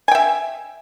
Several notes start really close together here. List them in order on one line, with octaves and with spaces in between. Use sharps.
G#5 G5 E5